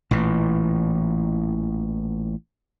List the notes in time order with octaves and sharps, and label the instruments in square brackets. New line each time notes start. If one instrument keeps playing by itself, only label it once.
[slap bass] A1 A#2 E3